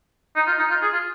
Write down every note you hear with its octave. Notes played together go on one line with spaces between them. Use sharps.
D#4
F4
D#4
F4
G#4
F4